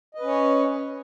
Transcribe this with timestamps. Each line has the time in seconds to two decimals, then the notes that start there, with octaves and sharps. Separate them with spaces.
0.15 D#5
0.19 B4
0.23 C#4
0.28 C#5